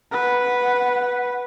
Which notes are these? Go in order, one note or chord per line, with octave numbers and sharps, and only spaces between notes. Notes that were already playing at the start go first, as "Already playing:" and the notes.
B4 F#5